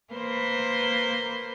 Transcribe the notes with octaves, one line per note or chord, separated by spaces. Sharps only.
A#3 B4 C5